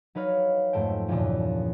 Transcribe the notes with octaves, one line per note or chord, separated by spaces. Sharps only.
F#3 D#4 B4 C#5 F5
F2 G#2 A3 C5 G5
E2 G2 A#2 C#3 E3 F3